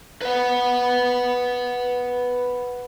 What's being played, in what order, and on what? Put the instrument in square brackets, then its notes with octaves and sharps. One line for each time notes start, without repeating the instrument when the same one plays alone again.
[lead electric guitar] B4 F#5